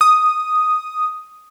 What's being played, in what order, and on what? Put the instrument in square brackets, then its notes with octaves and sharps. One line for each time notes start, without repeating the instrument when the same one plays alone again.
[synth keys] D#6